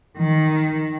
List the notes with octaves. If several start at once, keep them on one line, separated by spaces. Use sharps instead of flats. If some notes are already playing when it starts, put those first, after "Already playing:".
D#3